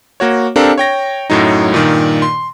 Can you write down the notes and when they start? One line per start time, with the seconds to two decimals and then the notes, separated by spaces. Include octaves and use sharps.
0.20 A#3 F#4 C#5
0.56 C4 D4 G4 A4 A#4 F5
0.78 C#5 G5 A#6
1.30 F#2 A2 F#3 D#4
1.72 G2 A#2 D#3
2.22 C6